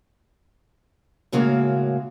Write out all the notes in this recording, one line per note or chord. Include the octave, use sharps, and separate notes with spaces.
A2 C#3 G#3 A#3 F#4